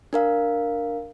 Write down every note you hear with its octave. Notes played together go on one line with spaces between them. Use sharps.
D4 A#4 F5